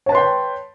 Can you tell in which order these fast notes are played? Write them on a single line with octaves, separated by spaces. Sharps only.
C#5 A5 B4 C6 G5